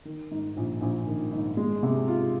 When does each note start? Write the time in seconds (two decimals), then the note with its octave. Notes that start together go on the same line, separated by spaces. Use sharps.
0.05 D#3
0.31 G#2
0.57 A#1
0.81 A#1
1.07 D#3
1.33 G#2
1.57 G#3
1.83 C3
2.08 F4